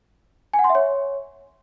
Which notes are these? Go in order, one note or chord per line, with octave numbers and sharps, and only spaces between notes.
G#5
F#5
C6
E5
C#5